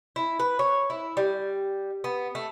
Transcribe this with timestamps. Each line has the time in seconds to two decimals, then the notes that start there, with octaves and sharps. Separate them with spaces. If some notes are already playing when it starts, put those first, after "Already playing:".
0.16 E4
0.40 B4
0.59 C#5
0.90 E4
1.17 G3
2.04 B3
2.35 A3